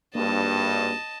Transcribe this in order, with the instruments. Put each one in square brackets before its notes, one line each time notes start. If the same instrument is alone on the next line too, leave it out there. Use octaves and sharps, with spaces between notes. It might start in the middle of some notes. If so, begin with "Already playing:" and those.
[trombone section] G#1 G2 [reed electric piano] A#3 [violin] D#5 A5